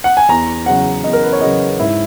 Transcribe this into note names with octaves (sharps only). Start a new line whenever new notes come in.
F#5
G#5
E2 A#5
C#3 F#3 C#4 F#5
E2 D#5
A#4
B4
C#5
C#3 F#3 C#4 D#5
G#2 E4